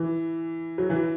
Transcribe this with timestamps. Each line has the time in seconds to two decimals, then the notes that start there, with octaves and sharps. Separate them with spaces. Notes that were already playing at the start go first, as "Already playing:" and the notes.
Already playing: E3
0.78 F#3
0.90 E3